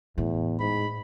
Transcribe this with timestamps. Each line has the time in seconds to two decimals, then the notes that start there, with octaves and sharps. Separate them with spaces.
0.18 E2 A2
0.60 G#2 B5